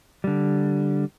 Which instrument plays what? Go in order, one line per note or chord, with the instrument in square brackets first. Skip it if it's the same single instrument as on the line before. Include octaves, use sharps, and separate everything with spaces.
[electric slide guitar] D3 G3